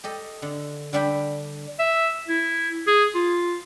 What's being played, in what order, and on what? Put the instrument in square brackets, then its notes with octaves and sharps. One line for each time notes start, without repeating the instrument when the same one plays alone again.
[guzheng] G4 A4 D#5
D3
D3 G3 D4 G4 G5 B5
[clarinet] E5
E4
G#4
F4